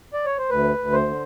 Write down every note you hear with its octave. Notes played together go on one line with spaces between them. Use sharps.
D5
C#5
C5
D2 B4
D2
C5
D3